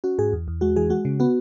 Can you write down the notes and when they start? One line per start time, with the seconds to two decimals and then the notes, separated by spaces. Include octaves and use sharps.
0.04 C#4 F#4
0.19 G#2 G#4
0.33 E2
0.48 E2
0.61 G#3 F#4
0.76 E3 G#4
0.90 G#3 F#4
1.05 C#3
1.20 B3 F#4